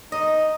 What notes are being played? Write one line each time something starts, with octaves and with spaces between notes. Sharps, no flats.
D#4 D#5